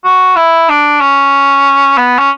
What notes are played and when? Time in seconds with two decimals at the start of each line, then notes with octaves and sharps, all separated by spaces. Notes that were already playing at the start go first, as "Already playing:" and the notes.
0.04 F#4
0.36 E4
0.69 D4
1.01 C#4
1.97 B3
2.19 C#4